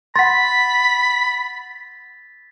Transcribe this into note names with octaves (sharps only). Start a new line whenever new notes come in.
F#5 B5 C6 A6 B6